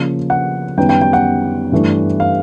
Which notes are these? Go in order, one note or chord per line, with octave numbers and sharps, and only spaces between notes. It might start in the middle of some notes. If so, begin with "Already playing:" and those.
Already playing: C#3 F3 A#3
F#5
F#2 D#3 G3 B3 D#4 G5
G5
G5
F#5
G2 E3 A3 D4
F5